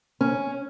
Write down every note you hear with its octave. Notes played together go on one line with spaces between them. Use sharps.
C#4